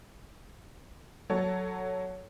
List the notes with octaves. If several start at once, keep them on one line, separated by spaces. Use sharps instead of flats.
F#3 A4 C#5